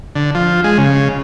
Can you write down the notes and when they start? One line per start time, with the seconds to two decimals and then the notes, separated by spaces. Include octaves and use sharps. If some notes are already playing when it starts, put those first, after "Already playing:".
0.16 D3
0.35 F3
0.64 G#3
0.78 C#3